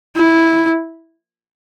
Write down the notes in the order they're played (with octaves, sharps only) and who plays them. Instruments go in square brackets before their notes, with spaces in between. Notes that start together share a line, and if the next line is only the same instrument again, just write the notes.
[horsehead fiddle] E4